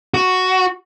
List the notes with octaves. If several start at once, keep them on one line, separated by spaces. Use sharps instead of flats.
F#4